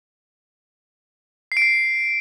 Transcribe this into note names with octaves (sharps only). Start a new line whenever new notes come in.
C7
D7
C7